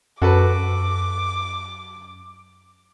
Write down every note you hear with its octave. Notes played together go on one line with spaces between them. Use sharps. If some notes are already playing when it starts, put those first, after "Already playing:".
F#2 F#4 A4 B4 D6